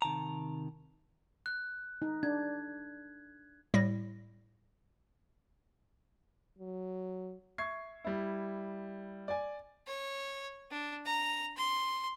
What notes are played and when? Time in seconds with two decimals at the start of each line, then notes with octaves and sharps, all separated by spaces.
0.02 C3 D#3 A5 A#5
1.46 F#6
2.02 D#4
2.23 D4 G#6
3.74 A2 G3 E4 A#6
6.59 F#3
7.58 E5 C#6 G#6 C7
8.04 G3 E4
9.28 D5 G#5
9.87 C#5
10.71 D4
11.06 A#5
11.57 C6